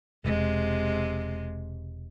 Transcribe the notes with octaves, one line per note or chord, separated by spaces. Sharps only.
E1 C3 G#3